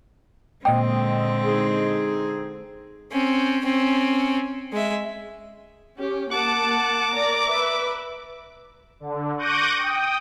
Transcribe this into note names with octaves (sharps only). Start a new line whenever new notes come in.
A#2 D3 G#3 C4 D#5 G5 D#6
D#4 G#4
C4 C#4
C4 C#4
G#3 E5
C#4 G4
A#3 F#5 A5 D6
A#4 D5 A#5
B4 E5
D3
C#6 D6 F#6 G6 A#6 D#7
G5 D#6